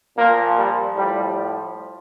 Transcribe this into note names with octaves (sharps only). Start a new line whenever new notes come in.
A#2 F3 A#3
G3
A2 F3 G3